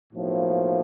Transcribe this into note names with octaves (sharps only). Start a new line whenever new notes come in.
B1 A2 F3 A#3